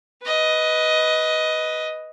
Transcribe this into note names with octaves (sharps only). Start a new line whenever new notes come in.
B4 D#5